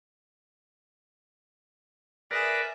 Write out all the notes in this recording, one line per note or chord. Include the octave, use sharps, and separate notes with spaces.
G#4 A#4 B4 D5 E5